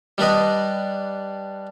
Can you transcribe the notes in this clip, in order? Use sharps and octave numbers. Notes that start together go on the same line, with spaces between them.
G3 D4 B4 D#5